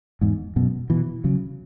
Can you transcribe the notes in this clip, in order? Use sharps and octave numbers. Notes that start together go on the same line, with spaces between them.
E2 G#2
F#2 B2
B2 E3
C#3 F#3